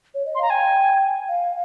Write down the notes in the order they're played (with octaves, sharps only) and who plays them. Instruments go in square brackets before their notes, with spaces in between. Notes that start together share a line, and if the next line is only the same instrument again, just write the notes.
[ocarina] C#5
D#5
[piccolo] C6
[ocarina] F5 [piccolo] A#5
[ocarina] G5 [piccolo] G#5
[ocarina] F5